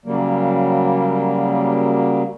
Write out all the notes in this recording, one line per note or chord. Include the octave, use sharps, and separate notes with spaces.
C#3 F#3 G3 A#3